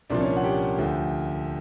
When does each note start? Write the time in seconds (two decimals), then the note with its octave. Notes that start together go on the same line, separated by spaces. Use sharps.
0.10 C2 A#2 F3 D4 D5
0.21 C#4 C#5
0.37 F#5
0.44 G4 G5
0.78 D2 D3 F3